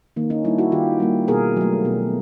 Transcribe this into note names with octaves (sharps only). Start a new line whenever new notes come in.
D#3 A#3
C#4 D#4
G3 A#3 D4 E4
E4 F#4
D#3 F4 G4
G3 A#3
B2 G#4 A#4
F#3 A3
B2